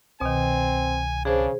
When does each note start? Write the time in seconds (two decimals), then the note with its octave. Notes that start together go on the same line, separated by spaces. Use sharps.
0.21 C2 B2 D#3 C4 G#5
1.25 C#3 D4 G#4 C5